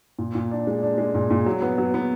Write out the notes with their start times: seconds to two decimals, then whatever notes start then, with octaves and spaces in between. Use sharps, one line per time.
0.19 A#2
0.35 A#2
0.51 D4
0.67 G#3
0.82 D4
0.98 G#3
1.15 A#2
1.31 A#2
1.46 F#3
1.62 B3
1.78 F#3
1.94 B3